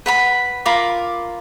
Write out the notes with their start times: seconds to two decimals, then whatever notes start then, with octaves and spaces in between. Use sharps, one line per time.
0.06 B4 F#5 B5
0.65 F4 A#4 B5 D6